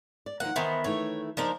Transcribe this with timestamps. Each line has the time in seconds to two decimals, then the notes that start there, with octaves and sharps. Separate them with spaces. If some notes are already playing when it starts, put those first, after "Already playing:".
0.26 D5
0.40 D#3 F3 A#3 F#5
0.56 D#3 E3 B3 C5
0.84 D#3 E3 A3 C#5
1.37 F3 A#3 D4 D#4 A#4 C5